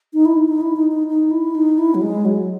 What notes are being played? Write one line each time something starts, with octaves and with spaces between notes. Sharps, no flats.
D#4
E4
D#4
D#4
E4
D#4
D#4
D#4
E4
D#4
E4
F#3
G#3
F#3